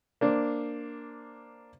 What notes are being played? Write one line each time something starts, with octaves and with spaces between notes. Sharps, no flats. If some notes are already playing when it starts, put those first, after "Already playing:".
A#3 D4 C5